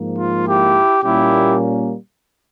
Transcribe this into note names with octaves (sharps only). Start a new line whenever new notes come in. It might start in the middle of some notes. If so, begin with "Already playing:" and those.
Already playing: G#2 F3 A#3
F4
E4 G4
A#2 G3 A#3 C#4 E4 G4